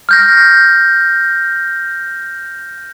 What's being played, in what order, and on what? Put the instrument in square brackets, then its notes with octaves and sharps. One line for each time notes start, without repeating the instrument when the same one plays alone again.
[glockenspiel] F6 G6 A#6